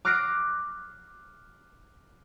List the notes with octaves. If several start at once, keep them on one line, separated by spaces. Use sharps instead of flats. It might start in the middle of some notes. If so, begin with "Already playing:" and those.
D6 F6 F#6 A#6 C7 D7